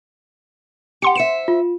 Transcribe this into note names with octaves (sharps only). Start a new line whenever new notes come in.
G4 F#5 C6 C#7
C5 E5 C#7 E7
F4